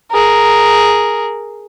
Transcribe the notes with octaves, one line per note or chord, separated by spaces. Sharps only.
G#4 A#4